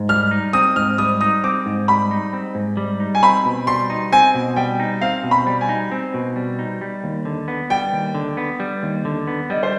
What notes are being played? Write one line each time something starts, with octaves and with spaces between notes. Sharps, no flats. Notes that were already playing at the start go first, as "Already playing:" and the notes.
Already playing: G#2
G3 F6
D#4
C4 D#6
G#2 F6
G3 D#6
D#4 D#6
C4 D6
G#2
G3 B5
D#4
C4
G#2
G3
D#4
G#5
C4 B5
B2
G3 C6
D#4
C4 G#5
B2
G3 G5
D#4
C4 F5
B2
B5
G3
G#5
D#4
C4
B2
G3
D#4
G3
D#2
D3
B3
G3 G5
D#2
D3
B3
G3
D#2
D3
B3
G3 D#5
C5